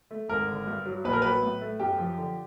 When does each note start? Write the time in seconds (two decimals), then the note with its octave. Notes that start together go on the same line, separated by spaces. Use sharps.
0.11 A3
0.29 G#1 A#4
0.48 D3
0.67 G2
0.86 F#3
1.04 A#1 B4
1.13 A#4
1.22 F#3 B4
1.42 A2
1.61 A3
1.79 F#2 G4
1.98 F3
2.17 D3